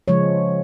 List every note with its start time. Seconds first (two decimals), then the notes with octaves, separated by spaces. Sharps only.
0.08 C#3 F3 G#3 C#5